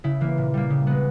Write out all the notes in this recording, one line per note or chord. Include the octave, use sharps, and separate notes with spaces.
C#3 E4
E3 A#3
A#2
G3 A#3
C#3
G#3 B3